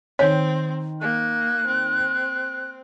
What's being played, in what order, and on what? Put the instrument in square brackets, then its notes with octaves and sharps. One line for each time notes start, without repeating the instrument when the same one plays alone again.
[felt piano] D#3 G6 [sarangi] C4 [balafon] C#5
[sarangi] A#3 [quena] F#6
[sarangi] C4